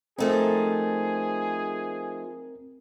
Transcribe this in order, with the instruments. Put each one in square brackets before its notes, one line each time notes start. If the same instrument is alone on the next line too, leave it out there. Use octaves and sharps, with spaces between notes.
[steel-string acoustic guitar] F3 A3 D#4 [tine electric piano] C4 A#4 [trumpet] G#4